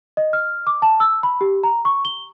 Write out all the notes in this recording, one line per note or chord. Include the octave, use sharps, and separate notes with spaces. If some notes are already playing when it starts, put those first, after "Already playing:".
D#5
F6
D6
A5
E6
B5
G4
A#5
C#6
G7